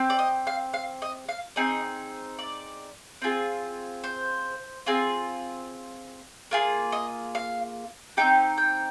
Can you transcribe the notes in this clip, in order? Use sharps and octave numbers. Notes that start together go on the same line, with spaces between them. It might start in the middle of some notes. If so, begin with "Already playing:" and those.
Already playing: C4 G4
D5
D#5
F5
F5
D#5
F5
C4 D#4 G#4 D#5
D5
C4 F4 G#4
C5
C4 F4 G#4
A#3 F4 G#4
D#5
F5
C4 D#4 G4 G5
G5